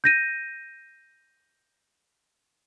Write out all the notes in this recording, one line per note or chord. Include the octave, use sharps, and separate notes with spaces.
G6 A#6 D#7